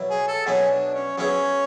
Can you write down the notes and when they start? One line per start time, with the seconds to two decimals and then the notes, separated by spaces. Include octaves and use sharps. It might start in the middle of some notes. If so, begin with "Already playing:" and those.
Already playing: B2 F#3 B3 E4
0.10 G#4
0.28 A4
0.46 B2 F#3 B3 E4 G#4
0.70 D4
0.94 C#4
1.18 F#3 B3 C#4 E4 G#4